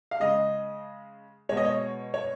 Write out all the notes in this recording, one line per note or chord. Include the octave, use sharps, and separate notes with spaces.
F5
C#3 G#3 D#5
B2 G#3 C#5
D#5
C#5
C#5